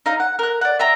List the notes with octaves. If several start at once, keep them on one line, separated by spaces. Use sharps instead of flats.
D#4 F5
F#5
A#4 F#6
D5 F#5
E5 G5 A#5